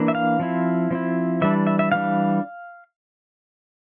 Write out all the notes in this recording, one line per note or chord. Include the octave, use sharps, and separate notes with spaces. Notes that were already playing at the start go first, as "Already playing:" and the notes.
Already playing: E3 A#3 D4
E5
F5
F3 C4 E4
F3 C4 E4
E3 G3 D4 E5
E5
E5
E3 G3 D4 F5